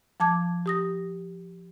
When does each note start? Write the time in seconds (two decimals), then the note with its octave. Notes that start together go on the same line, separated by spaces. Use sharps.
0.20 F3 A5 D6 G#6
0.66 G4 D#6 A#6